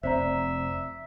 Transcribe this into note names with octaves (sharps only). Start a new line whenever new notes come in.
F1 C4 C5 D5 E5 A#5